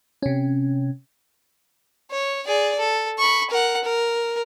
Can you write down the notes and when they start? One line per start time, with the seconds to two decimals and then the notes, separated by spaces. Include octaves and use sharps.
0.22 C3 C#4
2.11 C#5
2.47 G#4 D5
2.80 A4
3.19 B5 C#6
3.51 A#4 F#5
3.84 A#4